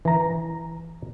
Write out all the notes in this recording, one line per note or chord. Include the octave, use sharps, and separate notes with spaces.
E3 A#5